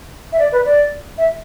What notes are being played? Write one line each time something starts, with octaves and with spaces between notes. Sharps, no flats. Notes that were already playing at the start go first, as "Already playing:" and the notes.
E5
D5
B4
D5
E5